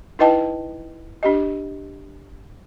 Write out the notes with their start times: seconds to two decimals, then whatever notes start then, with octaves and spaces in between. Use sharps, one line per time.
0.19 D#4 E4 B4 D#5 G5 A5
1.23 D4 G4 D#5